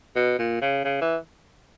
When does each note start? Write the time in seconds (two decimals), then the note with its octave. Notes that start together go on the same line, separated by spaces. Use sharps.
0.16 B2
0.38 A#2
0.61 C#3
0.84 C#3
1.01 E3